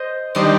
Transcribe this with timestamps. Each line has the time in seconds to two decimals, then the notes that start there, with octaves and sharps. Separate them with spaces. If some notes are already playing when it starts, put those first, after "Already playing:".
Already playing: C5 D#5
0.35 D#3 G3 D4 C5 D#5